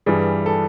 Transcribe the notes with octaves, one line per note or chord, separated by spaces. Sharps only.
G2 E3 G3 G#4
A4